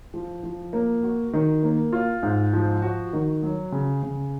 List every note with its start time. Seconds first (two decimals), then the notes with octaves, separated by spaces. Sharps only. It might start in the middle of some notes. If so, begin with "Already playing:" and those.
0.14 F3
0.44 F3
0.73 A#3
1.03 F#4
1.33 D#3
1.63 A#3
1.93 F4
2.23 G#2
2.53 F3
2.82 F#4
3.13 D#3
3.43 F#3
3.72 C#3
4.03 C#3